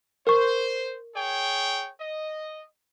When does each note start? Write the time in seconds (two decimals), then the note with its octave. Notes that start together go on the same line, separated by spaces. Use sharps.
0.27 A#4 C5 C#6
1.16 G#4 C#5 G5
2.01 D#5